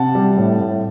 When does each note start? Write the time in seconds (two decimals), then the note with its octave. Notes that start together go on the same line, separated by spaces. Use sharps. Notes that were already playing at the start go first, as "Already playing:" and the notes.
Already playing: C3 F#5 A5
0.15 G3
0.37 A2
0.61 A2